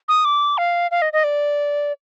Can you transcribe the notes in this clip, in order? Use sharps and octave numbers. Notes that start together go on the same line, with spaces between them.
D#6
D6
F5
F5
D#5
D#5
D5